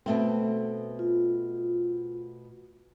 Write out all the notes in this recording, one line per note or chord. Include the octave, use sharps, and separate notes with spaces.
B2 A3 C4
F4